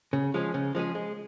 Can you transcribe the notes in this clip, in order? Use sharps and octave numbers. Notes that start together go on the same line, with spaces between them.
C#3
F3 G#3 C#4 G#4
C#3
F3 G#3 C#4 G#4
G#3